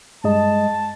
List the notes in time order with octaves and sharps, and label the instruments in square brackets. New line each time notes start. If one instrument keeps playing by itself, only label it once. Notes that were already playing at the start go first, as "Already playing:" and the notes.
[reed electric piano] G2 G#3 D#5 [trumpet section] A5